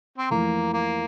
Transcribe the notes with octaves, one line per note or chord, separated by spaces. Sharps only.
C4
F2 E3 A3 A#3
A#3